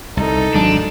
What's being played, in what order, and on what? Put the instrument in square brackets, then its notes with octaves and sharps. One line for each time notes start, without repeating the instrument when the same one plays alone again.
[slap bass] C2 [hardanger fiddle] D#4 A4
[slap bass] G#1 F#3 G#3 [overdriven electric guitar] D4